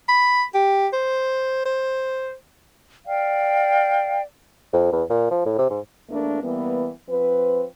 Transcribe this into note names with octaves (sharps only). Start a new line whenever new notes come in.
B5
G4
C5
C5
D5 F5 G5
F2
E2
A#2
F3
A2
C3
G#2
E2 A3 A#3 D4 A#4
E3 G3 A#3 B3
F3 C4 B4